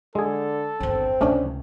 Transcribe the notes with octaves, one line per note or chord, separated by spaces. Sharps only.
D3 G#3 G#4 A4
G1 D#2 C4
C#2 C3 A3 C#4 D4